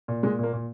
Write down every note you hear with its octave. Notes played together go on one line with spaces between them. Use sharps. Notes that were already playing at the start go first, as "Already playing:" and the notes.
A#2
A#2 G#3
A#2 A#3
A#2